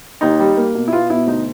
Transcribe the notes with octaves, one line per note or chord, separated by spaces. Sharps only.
D#2 D#4
G3
A#3
B2
E4
B3 F4
B2 E4
D2 D#4